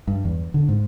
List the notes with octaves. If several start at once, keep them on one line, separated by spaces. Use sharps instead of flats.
G2
E2
D3
G#2